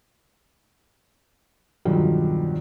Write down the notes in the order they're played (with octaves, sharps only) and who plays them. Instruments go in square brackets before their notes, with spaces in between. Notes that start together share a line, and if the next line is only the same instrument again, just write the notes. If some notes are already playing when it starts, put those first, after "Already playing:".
[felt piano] B1 E2 G2 D#3 F3 F#3